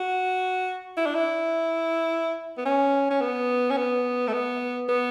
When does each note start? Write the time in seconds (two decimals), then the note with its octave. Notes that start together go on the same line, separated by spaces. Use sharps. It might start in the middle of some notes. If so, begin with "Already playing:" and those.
Already playing: F#4
0.97 E4
1.06 D4
1.15 E4
2.58 B3
2.65 C#4
3.11 C#4
3.21 B3
3.70 C#4
3.77 B3
4.27 A3
4.33 B3
4.89 B3